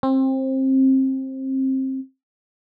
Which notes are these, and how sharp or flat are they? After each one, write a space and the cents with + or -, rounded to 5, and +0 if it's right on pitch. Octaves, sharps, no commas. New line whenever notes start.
C4 +25